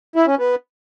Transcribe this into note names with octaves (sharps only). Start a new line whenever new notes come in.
E4
C#4
B3